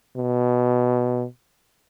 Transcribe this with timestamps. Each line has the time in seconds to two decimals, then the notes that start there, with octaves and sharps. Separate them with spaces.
0.17 B2